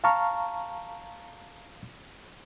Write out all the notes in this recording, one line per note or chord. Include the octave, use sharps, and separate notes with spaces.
F5 A5 A#5 C#6 F6